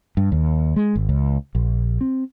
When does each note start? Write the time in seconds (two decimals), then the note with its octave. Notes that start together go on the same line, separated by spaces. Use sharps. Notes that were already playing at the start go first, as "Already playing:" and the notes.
0.17 G2
0.32 D#2
0.76 G#3
0.96 G#1
1.09 C#2
1.55 A#1
2.01 C4